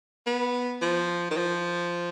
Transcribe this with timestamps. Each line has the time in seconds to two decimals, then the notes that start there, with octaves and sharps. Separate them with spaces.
0.27 B3
0.82 F3
1.31 D#3
1.38 F3